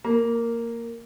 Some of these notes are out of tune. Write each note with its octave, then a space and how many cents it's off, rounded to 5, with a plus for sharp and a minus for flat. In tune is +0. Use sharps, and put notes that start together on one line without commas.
A#3 -10